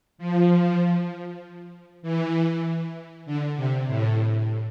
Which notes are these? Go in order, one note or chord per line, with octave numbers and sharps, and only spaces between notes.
F3
E3
D3
C3
A2